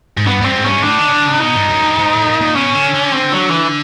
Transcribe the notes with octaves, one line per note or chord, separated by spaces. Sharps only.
G#2
G2 B3
G2 C4
G#2
G2 C#4
G#2
A2 D4
D#3
C#3
D3
C#3
B2 D#4
G2
F#2
G2
G#2
A2
A#2
A#2
B2 C#4
D3
D3
C4
F#3
E3